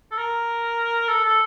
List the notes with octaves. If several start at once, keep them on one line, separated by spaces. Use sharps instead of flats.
A4
A#4
A4
A4